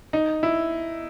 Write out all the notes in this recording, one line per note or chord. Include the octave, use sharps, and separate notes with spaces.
D#4
E4